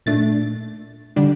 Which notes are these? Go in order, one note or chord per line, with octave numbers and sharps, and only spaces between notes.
A#2 A3 D4 A6
D3 G3 D4